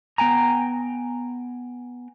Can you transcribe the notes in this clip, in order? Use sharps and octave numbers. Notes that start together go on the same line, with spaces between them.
B3 G5 G#5 A#5